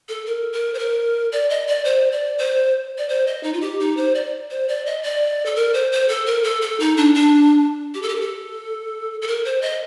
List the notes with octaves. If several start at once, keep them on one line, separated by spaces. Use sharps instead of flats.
A4
A#4
A#4
C5
A#4
D5
D#5
D5
C5
D5
C5
D5
C5
D#5
D#4
F4
G4
D#4
C5
D5
C5
D5
D#5
D5
A4
A#4
C5
C5
A4
A#4
A4
A4
D#4
D4
D4
G4
A4
G4
A#4
A4
A4
A#4
C5
D#5